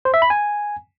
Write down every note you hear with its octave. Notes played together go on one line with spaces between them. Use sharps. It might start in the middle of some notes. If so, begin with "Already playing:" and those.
C5
E5
B5
G#5